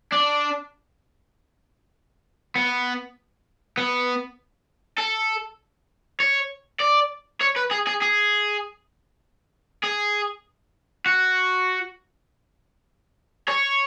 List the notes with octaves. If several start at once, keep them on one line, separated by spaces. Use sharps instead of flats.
D4
B3
B3
A4
C#5
D5
C#5
B4
G#4
G#4
G#4
G#4
F#4
C#5